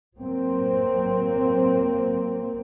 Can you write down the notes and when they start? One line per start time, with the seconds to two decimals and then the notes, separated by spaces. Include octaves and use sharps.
0.19 F#3 A#3 C4